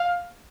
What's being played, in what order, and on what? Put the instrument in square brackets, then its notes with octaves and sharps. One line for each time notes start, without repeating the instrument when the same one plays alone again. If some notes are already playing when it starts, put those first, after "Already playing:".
Already playing: [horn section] F5